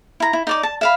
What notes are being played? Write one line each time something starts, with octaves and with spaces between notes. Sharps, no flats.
E4 A#5
E4
D#4 D5 D6
A5
E5 F5 B5